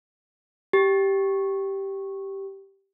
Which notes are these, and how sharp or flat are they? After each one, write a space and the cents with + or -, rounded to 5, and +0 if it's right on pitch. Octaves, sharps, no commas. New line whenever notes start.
G4 -5